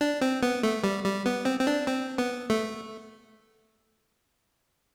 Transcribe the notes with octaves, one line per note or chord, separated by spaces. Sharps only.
D4
C4
B3
A3
G3
G3
B3
C4
C4
D4
C4
B3
A3